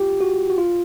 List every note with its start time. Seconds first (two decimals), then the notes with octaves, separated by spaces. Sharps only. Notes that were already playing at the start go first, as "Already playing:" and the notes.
Already playing: F4 G4
0.21 F#4
0.50 F#4
0.58 F4